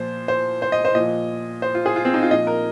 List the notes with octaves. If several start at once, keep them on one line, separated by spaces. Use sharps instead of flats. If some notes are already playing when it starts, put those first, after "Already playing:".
Already playing: A#2 F3 C5
C5
C5
D#5
C5
A#2 F3 D#5
C5
F4
G#4
F4
C4
D#4
F4
A#2 F3 D#5
A#4